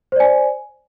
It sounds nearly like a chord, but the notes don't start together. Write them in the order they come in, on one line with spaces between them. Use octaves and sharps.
C5 D5 G#5